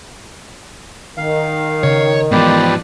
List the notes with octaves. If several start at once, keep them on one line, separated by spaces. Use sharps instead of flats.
D#3 F5
C#3 C#5
G#2 E3 F3 G#3 B3 G4 B4 D5